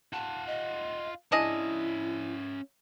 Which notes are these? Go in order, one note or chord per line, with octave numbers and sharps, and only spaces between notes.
F4 F#5 A5
D#5
C#4 D4 E4 G#4 D#5 E5